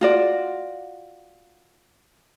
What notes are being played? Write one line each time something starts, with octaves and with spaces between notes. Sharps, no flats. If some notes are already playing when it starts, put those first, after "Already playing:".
F4 F#4 D5